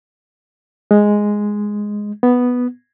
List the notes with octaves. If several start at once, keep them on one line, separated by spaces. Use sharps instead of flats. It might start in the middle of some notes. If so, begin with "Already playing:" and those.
G#3
B3